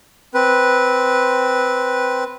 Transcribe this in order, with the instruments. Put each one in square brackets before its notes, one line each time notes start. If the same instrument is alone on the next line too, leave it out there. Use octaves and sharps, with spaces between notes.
[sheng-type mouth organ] C4 B4